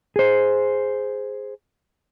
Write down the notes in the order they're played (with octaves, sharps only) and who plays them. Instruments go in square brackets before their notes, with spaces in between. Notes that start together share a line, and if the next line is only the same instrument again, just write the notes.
[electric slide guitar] G#4 C5